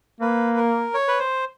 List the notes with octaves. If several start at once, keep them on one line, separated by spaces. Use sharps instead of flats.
A#3 B4
A#4
C#5
B4
C5